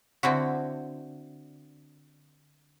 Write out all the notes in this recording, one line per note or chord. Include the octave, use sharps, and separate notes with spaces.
D3 C4 E4 F#4